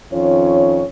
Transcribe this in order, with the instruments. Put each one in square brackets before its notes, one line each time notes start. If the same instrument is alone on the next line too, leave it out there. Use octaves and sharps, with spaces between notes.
[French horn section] F2 D#3 C#4 F4 C#5